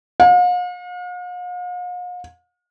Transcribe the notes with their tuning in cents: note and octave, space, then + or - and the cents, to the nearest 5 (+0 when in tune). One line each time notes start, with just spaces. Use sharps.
F5 +45